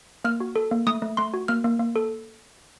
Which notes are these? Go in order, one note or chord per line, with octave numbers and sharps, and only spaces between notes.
A#3 F6
F#4
A4
A#3
A3 D#6
A3
A3 C6
F#4
A#3 F6
A#3
A#3
A4